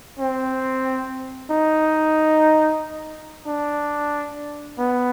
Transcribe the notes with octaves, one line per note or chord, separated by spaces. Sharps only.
C4
D#4
D4
B3